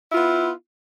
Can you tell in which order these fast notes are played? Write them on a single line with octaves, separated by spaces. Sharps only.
E4 F4 B3